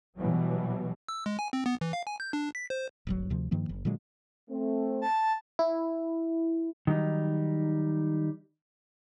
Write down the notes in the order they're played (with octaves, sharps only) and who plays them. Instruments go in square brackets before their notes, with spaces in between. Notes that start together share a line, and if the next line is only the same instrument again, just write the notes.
[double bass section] B2 E3 F#3 G3
[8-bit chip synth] E6
G#3
G#5
C4
B3
E3
F5
G#5
G6
D4
B6
C5
[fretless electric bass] D1 G1 F#3
D2 C3 F3
G2 D#3 F3 A#3
F#1
A#2 D3 F#3 G#3
[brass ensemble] A3 C4
[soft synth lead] A5
[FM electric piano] E4
[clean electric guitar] D#3 F#3 G3 D#4